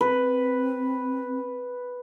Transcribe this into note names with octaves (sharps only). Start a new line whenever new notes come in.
C4 B4